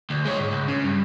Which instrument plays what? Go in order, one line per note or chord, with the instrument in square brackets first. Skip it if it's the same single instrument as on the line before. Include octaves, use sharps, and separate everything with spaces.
[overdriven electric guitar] D2
G#3 C#5
G#2
C#2
C#3
G2